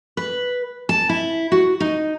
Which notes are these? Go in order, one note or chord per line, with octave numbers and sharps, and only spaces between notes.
B4
A5
E4
F#4
D#4